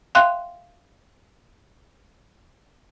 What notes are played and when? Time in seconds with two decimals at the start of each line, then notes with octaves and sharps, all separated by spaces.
0.15 E5 F5 G5 C6 F#6